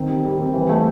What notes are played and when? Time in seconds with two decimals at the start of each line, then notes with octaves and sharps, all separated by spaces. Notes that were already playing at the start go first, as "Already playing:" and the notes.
Already playing: D#3 C4
0.09 G3
0.25 G3
0.39 C4
0.53 E3
0.69 A3